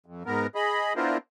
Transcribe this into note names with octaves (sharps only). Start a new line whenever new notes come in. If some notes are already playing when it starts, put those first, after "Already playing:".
F2
G#2 B3 A#4
G#4 D#5 B5
B3 D4 E4 F4 A#4 C5